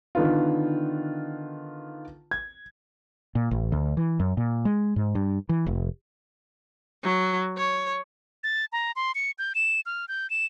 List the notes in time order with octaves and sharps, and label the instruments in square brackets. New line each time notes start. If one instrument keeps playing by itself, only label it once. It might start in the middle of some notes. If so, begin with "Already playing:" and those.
[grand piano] D3 D#3 B3 F4
G#6
[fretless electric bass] A#2
A1
D2
E3
F#2
A#2
G#3
G#2
G2
E3
F1
[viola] F#3
C#5
[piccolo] A6
A#5
C6
C#7
G6
E7
F6
G6
E7